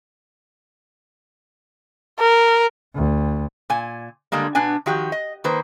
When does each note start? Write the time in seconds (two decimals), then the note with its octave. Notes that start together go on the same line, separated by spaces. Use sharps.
2.19 A#4
2.94 D2
3.70 A#2 G#5
4.32 D3 G3 G#3 A#3
4.55 B2 B3 D4 G#5
4.86 D#3 F3 F#4 G4
5.12 D#5
5.44 D#3 A#3 B4 C5